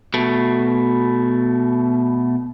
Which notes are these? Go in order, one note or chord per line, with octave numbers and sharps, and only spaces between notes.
B2 A3